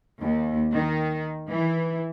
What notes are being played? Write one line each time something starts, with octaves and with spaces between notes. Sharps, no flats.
D#2
D#3
E3